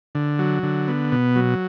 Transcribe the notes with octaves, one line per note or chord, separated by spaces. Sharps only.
D3
F#3
D3
B3
B2
F#3